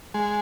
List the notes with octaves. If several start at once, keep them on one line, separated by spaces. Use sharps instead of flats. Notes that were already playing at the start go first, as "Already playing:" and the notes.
G#3